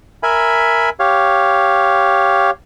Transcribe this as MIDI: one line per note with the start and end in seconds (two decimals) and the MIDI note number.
0.23 0.90 70
0.23 0.90 76
0.23 0.90 80
0.23 0.90 83
1.00 2.51 67
1.00 2.51 73
1.00 2.51 77